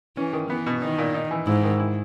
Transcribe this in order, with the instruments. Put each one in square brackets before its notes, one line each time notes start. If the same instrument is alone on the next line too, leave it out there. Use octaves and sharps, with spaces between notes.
[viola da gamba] E3 [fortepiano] C#4
[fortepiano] D#3
[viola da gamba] E3 [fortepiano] B3
[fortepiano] B2
[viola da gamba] D#3 [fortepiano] D#4
[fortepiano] A#2
D#4
E3
[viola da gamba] G#2 [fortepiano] E4
[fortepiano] D#3
E4